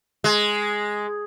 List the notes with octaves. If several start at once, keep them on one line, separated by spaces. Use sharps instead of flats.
G#3